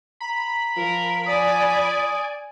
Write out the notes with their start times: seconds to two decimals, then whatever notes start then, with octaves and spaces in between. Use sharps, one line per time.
0.20 A#5 B5
0.77 F3 A#4
1.26 D5 G#5 D#6